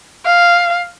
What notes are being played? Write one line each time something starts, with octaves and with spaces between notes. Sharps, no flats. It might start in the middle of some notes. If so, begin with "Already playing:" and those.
F5